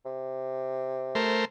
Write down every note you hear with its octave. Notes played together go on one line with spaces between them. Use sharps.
C3
A3 A#4 C5